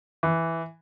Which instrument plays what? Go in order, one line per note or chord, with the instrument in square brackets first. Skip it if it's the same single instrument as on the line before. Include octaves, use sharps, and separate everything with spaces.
[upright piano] E3